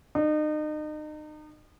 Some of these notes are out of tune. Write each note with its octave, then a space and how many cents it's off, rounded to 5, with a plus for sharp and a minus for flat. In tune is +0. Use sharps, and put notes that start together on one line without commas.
D#4 -35